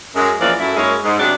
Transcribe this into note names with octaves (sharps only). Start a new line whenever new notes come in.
F#2 G#3
E2 E3 F3 A#3 C#4 D5
F#2 A3 E4
F#2 G#3 A#3 C#4 E4 C#5
G#2
C3 F#3 B3 D4